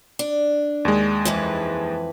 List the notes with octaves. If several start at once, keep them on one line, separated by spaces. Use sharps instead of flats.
D4
D#2 G#3
F2 E3 B4